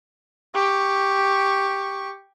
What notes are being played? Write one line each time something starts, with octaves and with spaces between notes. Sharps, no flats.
G4 C#6